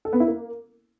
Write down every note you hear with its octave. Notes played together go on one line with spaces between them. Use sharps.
A4
B3
E4
A#3